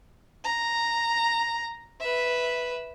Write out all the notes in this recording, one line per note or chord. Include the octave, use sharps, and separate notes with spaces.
A#5
B4 E5